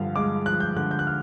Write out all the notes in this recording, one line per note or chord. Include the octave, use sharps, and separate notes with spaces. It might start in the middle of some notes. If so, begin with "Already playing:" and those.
Already playing: G2 D3 F3 F5
G#3 D6
F3 F#6
G6
D3 F#6
G6
F#6
F6